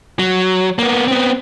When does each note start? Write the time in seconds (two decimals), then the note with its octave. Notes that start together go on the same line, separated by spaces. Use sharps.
0.19 F#3
0.79 A#3 B3
1.08 B3 C4